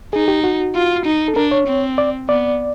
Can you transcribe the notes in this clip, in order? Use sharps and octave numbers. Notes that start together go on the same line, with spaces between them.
D#4 G#4
G4
F#4
F4
D#4
A4
D4 A#4
C#5
C4
D5
B3 D5